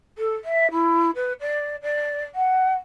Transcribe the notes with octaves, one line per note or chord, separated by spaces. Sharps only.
A4
E5
E4
B4
D5
D5
F#5